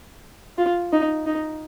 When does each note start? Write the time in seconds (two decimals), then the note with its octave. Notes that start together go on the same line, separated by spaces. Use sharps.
0.58 F4
0.92 D#4
1.26 D#4